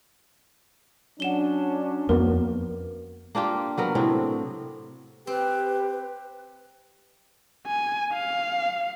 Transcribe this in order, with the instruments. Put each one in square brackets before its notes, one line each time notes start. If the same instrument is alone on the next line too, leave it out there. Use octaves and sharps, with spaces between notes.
[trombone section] F#3 C#4 D4 [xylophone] F#5 E7 G7
[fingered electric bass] F2 [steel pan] A#3 B3 F#4 [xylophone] A#4
[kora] A#3 D4 F4 G4
F#3 B3 A#4
A2 C3 F#3 C4
[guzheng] C4 [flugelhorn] G4 [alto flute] B4
[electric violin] G#5
F5